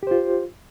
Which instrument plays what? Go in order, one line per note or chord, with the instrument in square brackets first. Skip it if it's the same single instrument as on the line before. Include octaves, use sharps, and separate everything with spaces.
[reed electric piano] G4
C5
F4